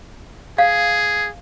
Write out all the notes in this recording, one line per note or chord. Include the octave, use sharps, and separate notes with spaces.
G#4 F5